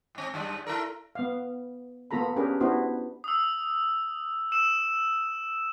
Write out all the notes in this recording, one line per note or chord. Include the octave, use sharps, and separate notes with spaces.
G#2 C4
F#2 G3 D5
E4 A4 A#4
B3 F5
A#3 B3 F4 A4 A#5 B5
C#4 D4 G4 G#4 A#4 B4
B3 D4 E4 F#4 G4 C5
D#6 E6
E6 E7